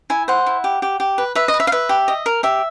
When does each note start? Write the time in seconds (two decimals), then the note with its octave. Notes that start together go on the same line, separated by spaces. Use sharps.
0.10 E4 G#5
0.28 C5 F#5
0.46 E4
0.64 G4
0.82 G4
1.00 G4
1.18 B4
1.35 B4 E5
1.48 D#5
1.54 B4
1.60 E5
1.67 F5
1.72 B4 E5
1.89 G4
2.08 D#5
2.26 A#4
2.43 G4 E5